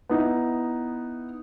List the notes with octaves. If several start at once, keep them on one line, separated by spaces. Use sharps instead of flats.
B3 D#4 E4